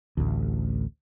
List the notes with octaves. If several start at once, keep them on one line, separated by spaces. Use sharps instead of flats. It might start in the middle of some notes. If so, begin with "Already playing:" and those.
A1 D2